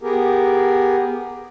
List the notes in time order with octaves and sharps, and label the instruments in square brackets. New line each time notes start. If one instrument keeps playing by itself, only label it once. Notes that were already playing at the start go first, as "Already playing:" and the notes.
[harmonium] B3 G4 G#4 A#4